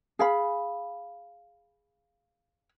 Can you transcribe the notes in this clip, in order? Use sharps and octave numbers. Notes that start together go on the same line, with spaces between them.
G#4 F5 B5